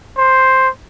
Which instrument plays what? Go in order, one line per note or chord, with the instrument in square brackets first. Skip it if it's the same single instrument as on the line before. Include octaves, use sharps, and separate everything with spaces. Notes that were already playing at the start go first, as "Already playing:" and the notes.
[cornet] C5